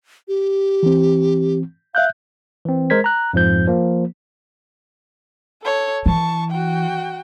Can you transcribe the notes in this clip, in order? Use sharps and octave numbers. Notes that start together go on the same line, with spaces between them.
G4
E3 C4
E5 F5 F#6 G6
E3 C4
G#3 A#4 C5 G#6 B6
A#5 F#6
F2 G#2 F3 G6
F3 A#3
A4 C#5
E3 A5 C#6
F#4 G5